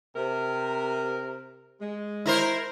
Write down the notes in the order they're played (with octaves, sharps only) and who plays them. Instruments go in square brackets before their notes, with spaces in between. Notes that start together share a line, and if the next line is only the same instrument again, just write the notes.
[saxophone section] C3 A#4
G#3
[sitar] E4 A#4 C5